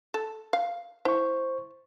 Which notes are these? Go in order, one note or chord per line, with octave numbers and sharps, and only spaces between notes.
A4
F5
E4 C5 C#6